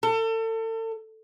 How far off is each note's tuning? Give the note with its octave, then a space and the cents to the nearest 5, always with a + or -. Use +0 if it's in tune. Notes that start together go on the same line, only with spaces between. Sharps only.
A4 +35